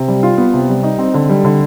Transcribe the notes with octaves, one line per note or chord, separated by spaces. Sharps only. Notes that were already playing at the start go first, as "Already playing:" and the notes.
Already playing: C3
G3
F4
B3
C3
G3
D#4
C4
D3
G3
D3